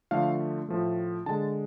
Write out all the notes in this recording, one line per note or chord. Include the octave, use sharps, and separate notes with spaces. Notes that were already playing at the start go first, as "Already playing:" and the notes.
D3 F3 A3 F5
A2 F3 A3
D3 G#3 A5